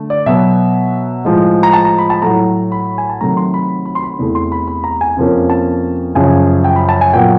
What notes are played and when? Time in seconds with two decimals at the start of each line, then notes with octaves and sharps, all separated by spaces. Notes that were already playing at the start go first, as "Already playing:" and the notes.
Already playing: D3 A3
0.10 D5
0.26 B2 F#3 B3 E5
1.25 A2 F3 G#3
1.63 A#5
1.73 A5
1.85 A#5
1.98 B5
2.10 A5
2.22 A2 F#3 A3 A#5
2.72 B5
2.98 G#5
3.10 A5
3.21 C3 D#3 F#3 A3 A#5
3.37 C6
3.54 B5
3.86 B5
3.95 C6
4.03 B5
4.19 E2 C3 E3 A3
4.35 C6
4.52 B5
4.68 B5
4.84 A#5
5.01 G#5
5.17 F2 C3 F3 A#3 C#4
5.50 A5
6.15 F#2 C#3 F3 G#5
6.64 G5
6.76 B5
6.89 A5
7.01 G#5
7.13 A#2 F#3 B3 G5